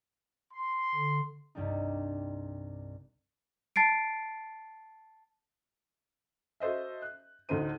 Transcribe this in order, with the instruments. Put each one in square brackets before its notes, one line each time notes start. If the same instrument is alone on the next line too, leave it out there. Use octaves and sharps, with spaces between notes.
[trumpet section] C6
[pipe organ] D3
[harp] C2 G2 G3 D4 D#4
[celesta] A5 A6 C7 D7
[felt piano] F#4 A4 C5 D#5 E5
F#6
D2 A2 D3 D#4 C5 D#7